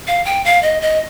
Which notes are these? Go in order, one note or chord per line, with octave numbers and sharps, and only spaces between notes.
F5
G5
F5
D#5
D#5